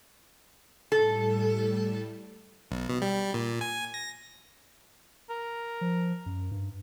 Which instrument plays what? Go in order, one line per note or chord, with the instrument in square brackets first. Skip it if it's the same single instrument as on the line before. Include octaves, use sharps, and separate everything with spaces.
[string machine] A2 G3 [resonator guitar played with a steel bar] A4
[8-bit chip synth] B1
B2
G3
A#2
G#5
A#6
[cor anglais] A#4
[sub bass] F3
F#2
G2